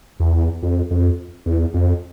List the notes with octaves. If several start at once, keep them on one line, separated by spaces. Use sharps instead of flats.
E2
F2
F2
E2
F2